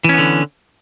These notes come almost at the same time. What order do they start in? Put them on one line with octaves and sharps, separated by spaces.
E3 C#4 B3 D3